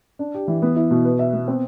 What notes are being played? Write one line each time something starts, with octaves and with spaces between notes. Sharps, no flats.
D4
G4
E3
B3
E4
B2
B4
E5
B3
C4